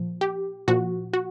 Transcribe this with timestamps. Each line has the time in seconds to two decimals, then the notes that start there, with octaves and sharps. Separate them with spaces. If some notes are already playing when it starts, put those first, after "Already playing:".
Already playing: A#2 F3
0.21 G4
0.68 A#2 F3 F#4
1.13 F#4